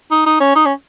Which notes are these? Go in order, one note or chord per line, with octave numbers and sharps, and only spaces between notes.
D#4
D#4
C#4
D#4
C#4